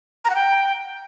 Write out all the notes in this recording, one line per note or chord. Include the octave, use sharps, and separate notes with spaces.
A#5
F#5
G5